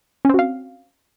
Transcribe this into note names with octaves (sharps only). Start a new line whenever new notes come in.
C4 C#4 F#4 F5